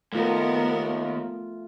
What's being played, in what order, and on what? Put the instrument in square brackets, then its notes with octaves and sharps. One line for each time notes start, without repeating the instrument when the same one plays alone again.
[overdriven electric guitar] D#2 [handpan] A3 F4 [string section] B3 A#4